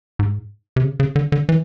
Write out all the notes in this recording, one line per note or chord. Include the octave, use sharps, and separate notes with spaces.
G#2
C3
C#3
C#3
D3
D3
E3